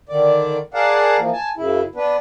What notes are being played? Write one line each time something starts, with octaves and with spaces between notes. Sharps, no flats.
D3 D#3 D5
G#4 A#4 D5 F5 F#5 A5
E3 F3 A#3
G#5 A5
F#2 C#3 E4
B3 D4 B4